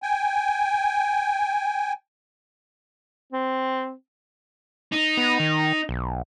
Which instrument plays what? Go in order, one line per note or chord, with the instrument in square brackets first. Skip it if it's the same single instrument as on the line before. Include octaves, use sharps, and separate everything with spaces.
[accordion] G5 G#5
[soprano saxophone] C4
[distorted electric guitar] D#4
[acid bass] B3
D#3
B1